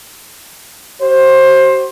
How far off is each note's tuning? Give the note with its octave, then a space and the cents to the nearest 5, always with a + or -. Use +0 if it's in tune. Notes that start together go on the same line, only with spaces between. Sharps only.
F#4 +45 C5 +20